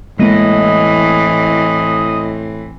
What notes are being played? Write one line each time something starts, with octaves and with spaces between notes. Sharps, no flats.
A2 E3 G#3 A#3 C4 D#5